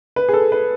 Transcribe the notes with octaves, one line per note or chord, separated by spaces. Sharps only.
B4
G#4
A4
B4